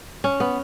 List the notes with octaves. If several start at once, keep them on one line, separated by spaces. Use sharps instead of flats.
C#4
B3